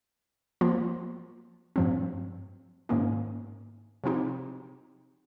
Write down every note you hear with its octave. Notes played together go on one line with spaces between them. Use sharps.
F3 A#3 F4
G2 F3 C4
G#2 D#3 A#3 C#4
C3 F3 C4 D#4 G4